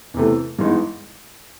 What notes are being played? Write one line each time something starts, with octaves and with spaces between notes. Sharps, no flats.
E2 C3 E3 A3
G2 E3 G#3 B3 D#4